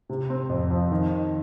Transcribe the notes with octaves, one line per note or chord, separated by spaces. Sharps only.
C3
C4
F2
F3
D#3